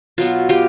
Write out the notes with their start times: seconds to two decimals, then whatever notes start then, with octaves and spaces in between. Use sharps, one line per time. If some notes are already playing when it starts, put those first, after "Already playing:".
0.18 B2 F#3 B3 F4
0.49 F4 G4